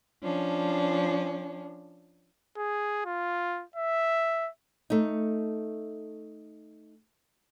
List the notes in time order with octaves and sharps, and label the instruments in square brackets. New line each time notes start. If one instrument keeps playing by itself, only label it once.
[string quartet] F3 C#4 D4
[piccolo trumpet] G#4
F4
E5
[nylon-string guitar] A3 D#4